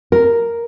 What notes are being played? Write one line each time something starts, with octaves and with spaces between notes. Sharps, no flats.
A#4